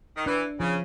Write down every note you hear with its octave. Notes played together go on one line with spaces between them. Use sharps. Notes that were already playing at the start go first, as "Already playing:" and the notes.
D#3
E3 D4
C#3 F3